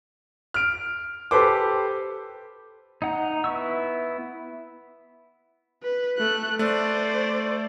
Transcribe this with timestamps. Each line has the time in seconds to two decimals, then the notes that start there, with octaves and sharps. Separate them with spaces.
0.54 F6 D7
1.31 G4 A4 B4 C5 D6
3.02 D#4 F#5 A#5
3.44 B3 E4 C#6 E6
5.83 B4
6.18 A3 F#6
6.59 A3 C5 D5